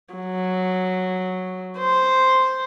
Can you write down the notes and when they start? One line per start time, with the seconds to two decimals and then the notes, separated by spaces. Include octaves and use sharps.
0.14 F#3
1.78 C5